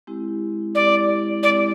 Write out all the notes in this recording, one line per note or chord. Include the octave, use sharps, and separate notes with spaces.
G#3 C4 E4 G4
G#3 C4 E4 G4 D5
G#3 C4 E4 G4 D5